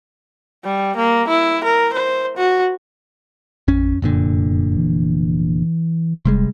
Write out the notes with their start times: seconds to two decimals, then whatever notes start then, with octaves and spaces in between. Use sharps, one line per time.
0.64 G3
0.96 A#3
1.28 E4
1.64 A#4
1.93 C5
2.37 F#4
3.68 A1 F2 C#4
4.02 F1 F#2 A#2 D3
4.76 E3
6.25 E1 C3 G3 G#3